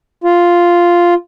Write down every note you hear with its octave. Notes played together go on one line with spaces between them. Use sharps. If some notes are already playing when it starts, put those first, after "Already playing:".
F4